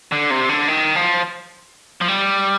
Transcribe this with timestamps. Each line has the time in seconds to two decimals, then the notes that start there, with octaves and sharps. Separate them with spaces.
0.12 D3
0.30 C3
0.49 D3
0.68 D#3
0.96 F3
2.01 F3
2.08 G3